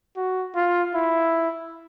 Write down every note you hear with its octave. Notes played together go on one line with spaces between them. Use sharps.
F#4
F4
E4